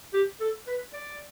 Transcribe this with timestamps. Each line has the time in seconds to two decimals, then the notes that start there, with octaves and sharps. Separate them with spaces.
0.13 G4
0.40 A4
0.67 B4
0.93 D5